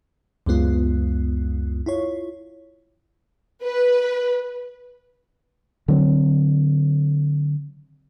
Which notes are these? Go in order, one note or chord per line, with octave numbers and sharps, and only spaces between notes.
C#2 F#2 G#3 B3 F4
E4 F4 C#5
B4
D3 F#3 C4